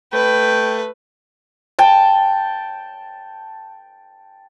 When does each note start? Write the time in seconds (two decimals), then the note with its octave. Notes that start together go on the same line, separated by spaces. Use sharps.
0.13 A3 B4 G5
1.79 G5 A5